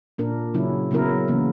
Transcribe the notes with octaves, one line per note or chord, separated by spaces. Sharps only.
A#2 A#3 D4 A#4
C#3 F#3 C#4 E4
C#3 F#3 B3 E4 A#4
C#3 E3 A#3